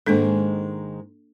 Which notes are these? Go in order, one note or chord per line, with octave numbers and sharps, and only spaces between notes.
G#2 D#3 G#3 A#3 D4 A4